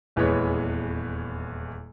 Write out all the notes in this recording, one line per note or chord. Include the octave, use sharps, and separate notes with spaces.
D#1 E2 E3 G#3 B3 C#5